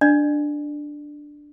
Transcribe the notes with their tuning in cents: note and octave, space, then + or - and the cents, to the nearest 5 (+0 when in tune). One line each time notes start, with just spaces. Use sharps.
D4 +0 D5 +40